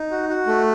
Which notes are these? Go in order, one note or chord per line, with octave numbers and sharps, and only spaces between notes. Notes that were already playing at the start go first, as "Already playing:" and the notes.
Already playing: D#4
F#4
F#4
A3